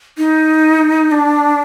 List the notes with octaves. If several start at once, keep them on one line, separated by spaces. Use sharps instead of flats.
D#4
D4